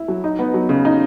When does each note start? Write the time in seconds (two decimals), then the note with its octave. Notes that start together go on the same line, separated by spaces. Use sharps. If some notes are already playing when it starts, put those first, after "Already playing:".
Already playing: E4
0.08 F#3
0.24 D#4
0.39 B3
0.54 F#3
0.69 C#3
0.85 D#4